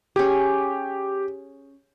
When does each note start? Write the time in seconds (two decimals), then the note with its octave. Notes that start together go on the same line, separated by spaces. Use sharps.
0.16 C#4 G4 G#4